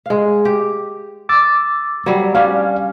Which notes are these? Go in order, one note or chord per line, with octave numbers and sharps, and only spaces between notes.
G#3 F5
G4
D6 E6 A6
F#3 G3
G3 C#4 D4 D5 F5